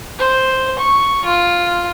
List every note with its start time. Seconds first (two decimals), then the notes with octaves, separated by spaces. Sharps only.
0.19 C5
0.79 C#6
1.25 F4